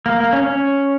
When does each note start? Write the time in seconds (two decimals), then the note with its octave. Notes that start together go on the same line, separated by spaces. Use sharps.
0.06 A#3
0.20 A#3
0.33 C#4
0.46 C#4